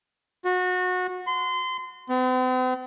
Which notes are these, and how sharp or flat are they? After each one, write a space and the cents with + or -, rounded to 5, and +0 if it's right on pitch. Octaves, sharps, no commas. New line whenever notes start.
F#4 -25
C6 -25
C4 -45